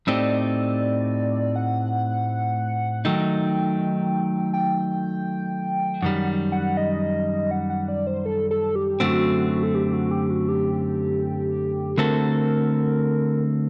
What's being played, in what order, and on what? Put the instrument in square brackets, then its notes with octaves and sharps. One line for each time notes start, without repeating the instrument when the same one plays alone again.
[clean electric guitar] A2 A3 C4 D#4 G4 [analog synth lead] D5
[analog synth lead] F#5
[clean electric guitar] D#3 F#3 A3 D#4 [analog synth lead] G5
[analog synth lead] G5
[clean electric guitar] F#2 D#3 G3 [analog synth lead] F#5
[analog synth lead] F#5
D#5
F#5
F#5
D5
C5
A4
A4
G4
[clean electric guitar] F#2 D3 A3 C4 [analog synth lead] F#4
[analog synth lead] A4
G4
F#4
G4
F#4
G4
[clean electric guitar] D3 A3 C4 F#4 A4 [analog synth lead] A#4